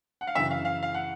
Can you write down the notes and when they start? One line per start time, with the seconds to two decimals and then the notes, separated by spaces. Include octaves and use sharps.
0.21 F#5
0.27 F5
0.35 F#2 C#3 E3 E5
0.51 F5
0.65 F5
0.83 F5
0.94 F#5